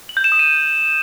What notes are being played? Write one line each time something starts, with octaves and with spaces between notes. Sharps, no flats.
F#7
G6
E7
D#6
D#7